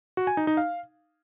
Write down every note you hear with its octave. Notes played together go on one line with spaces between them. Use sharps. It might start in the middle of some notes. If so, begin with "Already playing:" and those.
F#4
G#5
D#4
D#4
F5